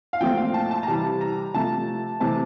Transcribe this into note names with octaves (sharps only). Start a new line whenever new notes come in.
F5
A#2 F3 A3 C4 G5
F5
A5
A5
A#5
C3 E3 G3 A5
A#5
C3 F3 A3 A5
C3 E3 A3 C4 A5